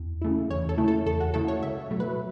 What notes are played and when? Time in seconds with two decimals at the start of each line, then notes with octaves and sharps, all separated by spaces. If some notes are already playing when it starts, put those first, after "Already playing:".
Already playing: E2
0.21 C#3 A3 E4
0.50 E2 C#5
0.69 A4
0.78 C#3 A3 E4
0.88 A4
1.06 E2 A4
1.20 F#4
1.34 C#3 A3 E4 A4
1.48 C#5
1.62 C#2 E5
1.91 B2 F#3 A3
2.00 B4